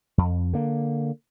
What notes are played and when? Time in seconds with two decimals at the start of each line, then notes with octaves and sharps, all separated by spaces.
0.18 F2
0.53 D3 A#3